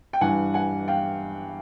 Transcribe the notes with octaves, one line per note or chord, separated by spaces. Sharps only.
G5
G2 E3 F#5 G#5
F#5 G#5
F5 G5